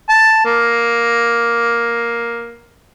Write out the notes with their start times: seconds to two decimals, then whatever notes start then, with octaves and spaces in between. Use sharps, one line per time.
0.09 A5
0.45 A#3